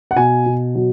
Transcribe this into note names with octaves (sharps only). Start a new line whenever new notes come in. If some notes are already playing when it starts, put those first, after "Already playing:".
F#5
B2 G#5
B2
F#3